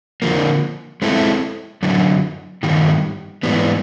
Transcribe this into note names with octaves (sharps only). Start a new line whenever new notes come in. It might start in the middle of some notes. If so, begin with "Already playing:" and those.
D3 F3 A#3
G#3 C4 E4 A4
F#2 D3 F#3
G2 D#3 G3
G#2 E3 G3 B3